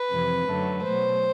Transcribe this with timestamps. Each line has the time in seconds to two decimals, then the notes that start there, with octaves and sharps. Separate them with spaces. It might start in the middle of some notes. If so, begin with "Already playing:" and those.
Already playing: B4
0.10 F2 C3 E3
0.46 F#2 D3 F#3 A3
0.84 B2 F#3 A3 C5